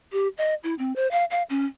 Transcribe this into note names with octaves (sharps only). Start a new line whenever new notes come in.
G4
D#5
E4
C4
C5
F5
F5
C#4